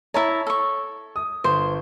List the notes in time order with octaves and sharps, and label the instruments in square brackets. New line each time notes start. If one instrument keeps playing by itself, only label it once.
[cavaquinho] E4 A5 A#5 [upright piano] C#5
[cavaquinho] A4 C#6
[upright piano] D#6
[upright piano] G1 [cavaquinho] C5